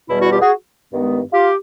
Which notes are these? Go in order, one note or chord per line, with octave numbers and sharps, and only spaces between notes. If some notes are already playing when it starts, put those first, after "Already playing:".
E2 B2 G3 B3 E4
E4 F#4
F4 G4
F#4 G#4
G2 D#3 G#3 B3
F4 G4